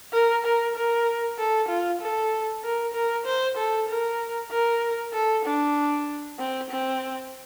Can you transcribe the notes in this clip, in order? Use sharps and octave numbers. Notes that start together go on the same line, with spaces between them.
A#4
A#4
A#4
A4
F4
A4
A#4
A#4
C5
A4
A#4
A#4
A4
D4
C4
C4